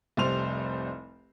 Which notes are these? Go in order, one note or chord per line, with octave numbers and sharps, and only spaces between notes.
F1 C2 G3 C5 C6 F7